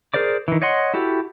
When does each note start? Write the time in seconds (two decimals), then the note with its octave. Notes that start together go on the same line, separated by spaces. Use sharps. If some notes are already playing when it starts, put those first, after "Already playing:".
0.14 G#4 A#4 C5 D5 D6
0.48 D#3 E3
0.62 C#5 D#5 F#5 C6
0.94 E4 F#4 G4 A4